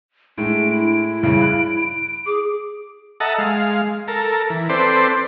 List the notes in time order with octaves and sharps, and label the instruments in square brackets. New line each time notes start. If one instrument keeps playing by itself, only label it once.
[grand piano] A2 G#3 [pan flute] D4 [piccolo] D7
[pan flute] E4
[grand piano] G2 C#3 E3 [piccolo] D7
[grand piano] F#6
[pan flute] G#4 [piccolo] D6
[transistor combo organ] A4 D#5 E5 F#5 A5 A#5
G#3 F5
A4 A#4
E3
C4 A4 B4 C5 D5